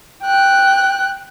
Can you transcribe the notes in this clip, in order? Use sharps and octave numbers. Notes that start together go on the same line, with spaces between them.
G5 F#6